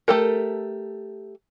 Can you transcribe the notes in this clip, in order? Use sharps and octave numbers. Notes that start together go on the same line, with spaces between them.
A3 G4 A4 A#4